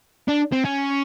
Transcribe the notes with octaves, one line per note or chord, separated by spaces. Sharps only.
D4
C4
C#4